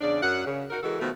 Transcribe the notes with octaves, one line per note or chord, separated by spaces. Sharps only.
E2 C#3 D4 D5
F#2 F#5
C#3
D#4 F#4 A#4
E3 G#3 F#4 A4 A#4
B2 D#3 F3 A3